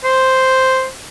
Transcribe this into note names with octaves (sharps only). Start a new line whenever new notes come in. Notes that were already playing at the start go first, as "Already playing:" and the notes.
C5